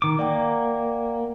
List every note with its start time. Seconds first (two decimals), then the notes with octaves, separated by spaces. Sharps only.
0.02 D#3 D6
0.19 A#3 D5 F#5 G5